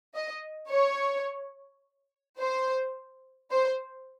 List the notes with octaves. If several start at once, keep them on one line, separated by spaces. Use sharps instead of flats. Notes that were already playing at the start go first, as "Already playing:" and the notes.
D#5
C#5
C5
C5